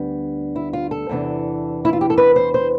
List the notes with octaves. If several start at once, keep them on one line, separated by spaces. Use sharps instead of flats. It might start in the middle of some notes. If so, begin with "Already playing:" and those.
Already playing: D2 G3 B3 D4
E4
F4
A4
E2 C3 E3 B3 D4
E4
F4
G4
A4
B4
C5
C5